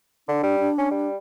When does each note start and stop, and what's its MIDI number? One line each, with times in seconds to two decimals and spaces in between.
0.28 0.43 50
0.28 0.56 62
0.43 0.70 55
0.60 1.08 62
0.78 0.88 61
0.91 1.16 55